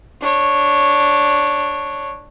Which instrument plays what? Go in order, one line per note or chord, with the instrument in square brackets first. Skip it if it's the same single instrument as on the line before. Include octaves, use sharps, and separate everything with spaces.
[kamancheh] D4 C#5